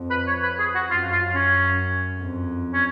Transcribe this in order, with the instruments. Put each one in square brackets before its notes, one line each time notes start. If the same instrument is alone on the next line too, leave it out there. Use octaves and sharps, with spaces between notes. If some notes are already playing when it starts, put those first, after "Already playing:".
Already playing: [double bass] F2
[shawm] B4
C#5
B4
G#4
F#4
[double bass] F#2 [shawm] F4
[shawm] F4
C#4
[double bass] F2
[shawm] C#4